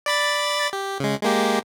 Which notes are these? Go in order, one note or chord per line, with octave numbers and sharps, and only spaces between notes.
D5 B5 A6
G4
C#3 G#3
G#3 A#3 G4